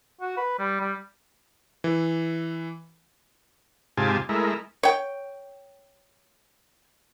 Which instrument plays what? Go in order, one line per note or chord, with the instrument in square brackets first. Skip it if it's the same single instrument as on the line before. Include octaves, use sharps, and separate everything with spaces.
[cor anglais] F#4
B4
G3
G3
[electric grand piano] E3
[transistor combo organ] G#2 C3 F4 G4 G#5 A5
G#3 A3 E4 A#4
[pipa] C#5 G5